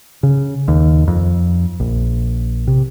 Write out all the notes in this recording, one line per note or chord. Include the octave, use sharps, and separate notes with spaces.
C#3
D#2
F2
A#1
C3